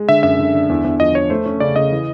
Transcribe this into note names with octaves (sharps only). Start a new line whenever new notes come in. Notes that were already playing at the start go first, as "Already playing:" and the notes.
Already playing: G#3
D3 E5
F#2 E5
D3
D3
E2
E2
F3 D#5
F3 C#5
A3 C5
C#4
C#3 D5
C#3 D#5
E3